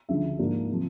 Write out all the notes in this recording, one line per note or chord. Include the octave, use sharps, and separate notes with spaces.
D2 C#3 F3 E5
G#2 F3 A#3 D4
C3 F3